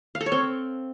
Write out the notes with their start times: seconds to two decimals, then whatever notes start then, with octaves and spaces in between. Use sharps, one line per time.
0.15 F5
0.21 A4
0.26 C#5
0.32 C4